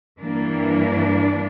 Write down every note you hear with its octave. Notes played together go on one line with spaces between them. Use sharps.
G2 E3 G3 A#3 D4